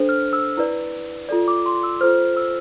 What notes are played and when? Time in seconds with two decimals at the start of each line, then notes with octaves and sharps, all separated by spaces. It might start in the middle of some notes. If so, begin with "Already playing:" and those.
Already playing: D4 A4 C5
0.09 F6
0.33 E6
0.57 E4 B4 D5
1.29 F4 A4 D5
1.48 D6
1.66 C6
1.83 E6
2.01 F4 A4 C5 F6
2.37 E6